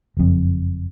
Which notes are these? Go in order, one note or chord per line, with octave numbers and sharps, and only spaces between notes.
F#1 F2